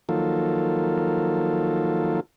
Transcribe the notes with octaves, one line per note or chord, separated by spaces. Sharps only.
D#3 F3 F#3 A#3 F4 A4